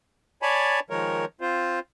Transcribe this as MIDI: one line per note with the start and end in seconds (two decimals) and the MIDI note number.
0.42 0.80 73
0.42 0.80 74
0.42 0.80 80
0.42 0.80 81
0.42 0.80 83
0.90 1.25 51
0.90 1.25 53
0.90 1.25 56
0.90 1.25 70
0.90 1.25 73
1.41 1.79 60
1.41 1.79 65
1.41 1.79 72